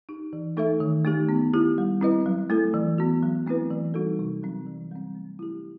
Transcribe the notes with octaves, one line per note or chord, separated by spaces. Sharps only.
D#4 G4
E3
A3 D#4 A4 E5
D#3
A3 D#4 G4
B3
E4 G4
G3
C4 E4 B4 D#5
F#3
A3 E4 A4
E3
B3 F#4
F#3
A3 C4 E4 B4
E3
G3 D#4 F#4 A4
C3
F#3 C4
E3
G3 C4
A3
E4 G4